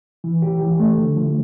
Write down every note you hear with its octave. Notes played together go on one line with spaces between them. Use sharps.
E3
G4
E3
A3
D3
F3